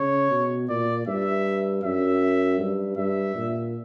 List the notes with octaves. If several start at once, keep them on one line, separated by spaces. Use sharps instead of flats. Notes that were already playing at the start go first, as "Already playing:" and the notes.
Already playing: C#3 C#5
B2
A#2 D5
G2 E5
F#2 E5
G2
G2 E5
A#2